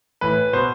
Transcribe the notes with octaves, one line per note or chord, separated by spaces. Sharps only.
A2 E3 B4
B2 C5